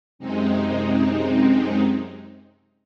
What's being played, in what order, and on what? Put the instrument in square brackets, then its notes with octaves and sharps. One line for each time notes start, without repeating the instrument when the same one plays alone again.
[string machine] F#2 C3 G#3 C4 D#4